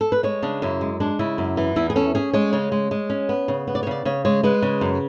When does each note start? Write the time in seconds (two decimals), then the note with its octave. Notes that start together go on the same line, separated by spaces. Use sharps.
0.01 A4
0.12 B4
0.23 G#3 C#5
0.43 C#3 D4
0.62 F#2 E4
0.81 G#3
1.00 G#3 D4
1.19 C#3 E4
1.38 F#2
1.57 E3
1.76 E2 E4
1.90 G#4
1.96 C#4 A4
2.15 C#4 G#4
2.33 G#3 C#5
2.53 C#3 C#5
2.72 G#3
2.91 G#3
3.10 C#4
3.29 B3
3.48 C#3
3.67 B3
3.75 D5
3.83 C#5
3.87 C#3 D5
4.05 C#3 C#5
4.25 G#3 C#5
4.43 G#3 B4
4.62 C#3
4.81 F#2